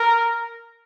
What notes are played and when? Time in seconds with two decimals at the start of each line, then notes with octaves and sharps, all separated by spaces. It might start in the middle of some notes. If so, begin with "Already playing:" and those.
Already playing: A#4